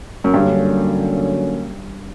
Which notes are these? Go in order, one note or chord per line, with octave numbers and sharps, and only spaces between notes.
F#2
G2 D3 F#3 A#3 C#4